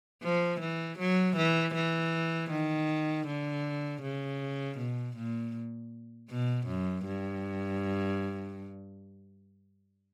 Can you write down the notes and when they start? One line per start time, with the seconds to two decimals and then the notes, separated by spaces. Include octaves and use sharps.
0.23 F3
0.60 E3
0.99 F#3
1.36 E3
1.75 E3
2.51 D#3
3.27 D3
4.02 C#3
4.78 B2
5.16 A#2
6.30 B2
6.67 F#2
7.06 G2